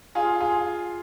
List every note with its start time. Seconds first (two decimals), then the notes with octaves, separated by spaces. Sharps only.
0.15 F4 G#4
0.40 F4 G#4